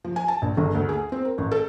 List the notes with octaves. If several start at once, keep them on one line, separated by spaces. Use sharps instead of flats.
F3
G#5
A5
A#1
G1
D2
G#4
C4
A#4
A1
A4